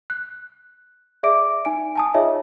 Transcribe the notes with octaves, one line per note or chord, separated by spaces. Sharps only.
F#6
G#4 D5 E5 D6 D7
D#4 G#5 D7
G#5 A5 D#6
D#4 F4 G#4 C#5 D#5 E5